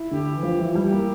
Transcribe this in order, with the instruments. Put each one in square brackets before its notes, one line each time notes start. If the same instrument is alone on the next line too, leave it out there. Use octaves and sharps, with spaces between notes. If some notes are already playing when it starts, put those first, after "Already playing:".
Already playing: [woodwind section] E4
[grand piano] D3 [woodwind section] G4
[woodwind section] E3
[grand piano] F3
[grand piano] F3 [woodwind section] E4
[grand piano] G3
[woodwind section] G4
[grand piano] A#3